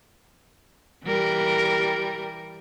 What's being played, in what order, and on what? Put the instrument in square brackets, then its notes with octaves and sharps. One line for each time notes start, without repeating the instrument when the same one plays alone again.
[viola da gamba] E3 G3 A#4